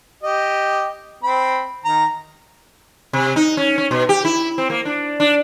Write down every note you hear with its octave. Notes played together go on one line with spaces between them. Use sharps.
G4 D#5
C4 B5
D#3 A#5
C3
D#4
C#4
C#4
B2
G4
E4
C4
A#3
D4
D4